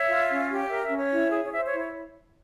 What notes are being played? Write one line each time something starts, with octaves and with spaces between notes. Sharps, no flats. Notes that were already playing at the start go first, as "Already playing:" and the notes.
Already playing: C#5 E5
F4
C#4
G4
C#5
A#4 E5
E5
C#4
C#5
E4
G#4
C#5
C5 E5
C#5
E4
C#5